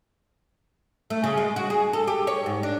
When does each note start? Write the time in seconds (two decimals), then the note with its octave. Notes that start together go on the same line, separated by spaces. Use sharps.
1.10 A3
1.24 C#3
1.37 G#3
1.56 F#4
1.70 G#4
1.93 A4
2.07 G4
2.27 C#5
2.46 G#2
2.63 D4